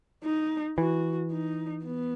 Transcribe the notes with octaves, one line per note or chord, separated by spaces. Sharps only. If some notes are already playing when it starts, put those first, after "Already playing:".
D#4
E3 F#4
D#4
B3